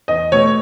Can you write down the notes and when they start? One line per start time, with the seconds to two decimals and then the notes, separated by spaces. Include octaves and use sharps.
0.08 E2 D#5
0.32 B2 A3 C#5